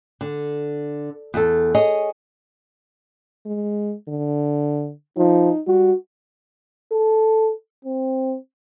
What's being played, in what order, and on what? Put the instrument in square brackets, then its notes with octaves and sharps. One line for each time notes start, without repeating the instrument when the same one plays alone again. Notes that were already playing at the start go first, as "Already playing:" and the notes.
[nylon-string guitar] D3
E2 A4
G#4 C#5 D#5
[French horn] G#3
D3
[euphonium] F3 [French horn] D#4
[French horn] G3 [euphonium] F#4
[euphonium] A4
C4